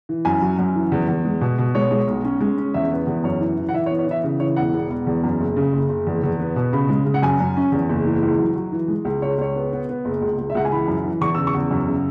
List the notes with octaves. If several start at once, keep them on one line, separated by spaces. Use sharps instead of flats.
E3
F#2 G#5
F#3
F#2
E3
E2
E2
G#3
B2
B2
G#3 C#5
G#3
B1
C#4
G#3
C#4
E2 E5
B3
E2
F#2 C#5
E3
E3
F#5
E3 E5
C#5
B3
C#5
E3 E5
C#3
E3 C#5
E1 F#5
E1
E1
E2
F#2
F#1
C#3
F#1
F#1
E2
E2
B3
B2
C#3 B5
G#3
C#3
F#5
F#2 G#5
F#2
C#4
E2
F#1
E3
C#2
F#3
F#3
E3
G#3
C#2
C#2 C#5
C#2 C#5
B3
B3
B3
F#1
C#2
C#2
E5
C#2 F#5
G#5
E3 B5
F#2
E3
E2 C#6
C#3 E6
C#6
E2
F#2
C#3